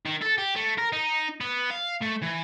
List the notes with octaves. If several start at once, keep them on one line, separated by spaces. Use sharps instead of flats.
D#3
A4
G4
A3
A#4
D#4
B3
F5
A3
E3